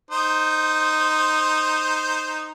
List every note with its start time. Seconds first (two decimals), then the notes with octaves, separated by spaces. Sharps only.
0.11 D#4 C5